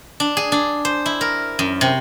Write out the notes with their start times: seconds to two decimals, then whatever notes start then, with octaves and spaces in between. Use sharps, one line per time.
0.20 D4
0.37 G#4
0.52 D4
0.85 C5
1.06 E4
1.21 A#4
1.59 F#2
1.81 C3